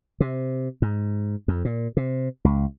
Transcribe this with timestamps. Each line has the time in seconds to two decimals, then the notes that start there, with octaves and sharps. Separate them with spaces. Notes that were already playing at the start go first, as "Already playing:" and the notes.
0.20 C3
0.82 G#2
1.48 F2
1.65 A#2
1.97 C3
2.45 C#2